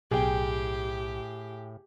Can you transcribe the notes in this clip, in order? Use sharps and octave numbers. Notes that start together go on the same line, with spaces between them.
B1 A2 G4 G#4 G5